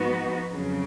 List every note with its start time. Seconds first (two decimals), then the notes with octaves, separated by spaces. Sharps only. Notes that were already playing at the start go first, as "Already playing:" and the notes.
Already playing: G#2 F3 B3 D#4 F#4
0.52 F2 C#3 F#3